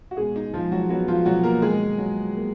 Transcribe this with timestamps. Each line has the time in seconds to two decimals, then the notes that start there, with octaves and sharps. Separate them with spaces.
0.11 F#4
0.17 B2 G#3 G#4
0.36 D#4
0.53 F3 G#3 F4
0.72 F#3 F#4
0.89 F#3 B3 F#4
1.08 F3 F4
1.25 B2 F#3 F#4
1.43 A#3 A#4
1.62 D#3 G#3 G#4
1.98 F#3
2.34 A#3